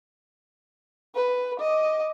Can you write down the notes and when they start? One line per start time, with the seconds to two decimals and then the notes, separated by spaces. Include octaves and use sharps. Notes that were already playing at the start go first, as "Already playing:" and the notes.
1.15 B4
1.60 D#5 D6